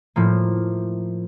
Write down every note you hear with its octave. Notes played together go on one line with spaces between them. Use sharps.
A2 F3 A#3